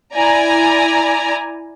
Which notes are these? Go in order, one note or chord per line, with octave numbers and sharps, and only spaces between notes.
E4 D5 G#5 A#5